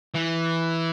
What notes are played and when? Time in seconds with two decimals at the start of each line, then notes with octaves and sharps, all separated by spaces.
0.15 E3